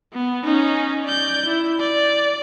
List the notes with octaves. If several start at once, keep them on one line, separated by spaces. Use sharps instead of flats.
B3
C#4 D#4
D5 G6
E4
D5